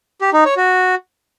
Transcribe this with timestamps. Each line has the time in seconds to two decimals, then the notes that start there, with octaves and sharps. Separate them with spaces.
0.21 G4
0.33 D#4
0.45 C#5
0.57 F#4